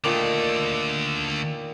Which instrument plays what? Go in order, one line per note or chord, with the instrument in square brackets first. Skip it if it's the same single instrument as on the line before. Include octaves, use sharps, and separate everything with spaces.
[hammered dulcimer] A#2 D#3 D5 [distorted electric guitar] D3 A3